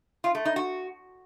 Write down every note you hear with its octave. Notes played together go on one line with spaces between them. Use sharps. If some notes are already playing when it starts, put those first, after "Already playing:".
F4
A3
D#4
F#4